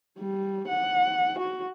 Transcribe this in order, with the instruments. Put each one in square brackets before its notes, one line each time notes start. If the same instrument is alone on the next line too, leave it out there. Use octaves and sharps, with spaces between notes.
[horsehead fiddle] G3
F#5
F#4